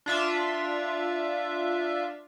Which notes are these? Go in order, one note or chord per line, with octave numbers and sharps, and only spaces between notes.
D4 F4 E5